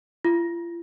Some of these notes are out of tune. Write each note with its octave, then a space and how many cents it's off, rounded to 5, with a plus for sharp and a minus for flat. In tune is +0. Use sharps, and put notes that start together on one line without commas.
F4 -40